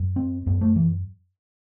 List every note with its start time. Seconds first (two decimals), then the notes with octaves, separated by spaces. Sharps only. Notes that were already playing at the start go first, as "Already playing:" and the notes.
Already playing: F#2
0.16 C4
0.46 F#2 B3
0.61 A3
0.76 E3